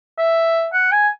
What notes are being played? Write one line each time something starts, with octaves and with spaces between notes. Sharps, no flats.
E5
F#5
G#5